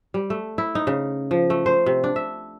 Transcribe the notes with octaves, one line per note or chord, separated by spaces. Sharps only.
G3
A3
E4
D#4
C#3
F3
A3
C5
C3
D4
E5